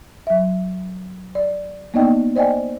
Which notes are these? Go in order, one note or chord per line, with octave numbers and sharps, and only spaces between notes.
F#3 E5
D5
A#3 B3 D#4 D5 D#5 G5
C5 D5 D#5 G5 G#5